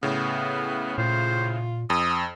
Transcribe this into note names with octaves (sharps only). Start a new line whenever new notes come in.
A2 C#3 B3
A#2 F4 C5
F2 D#6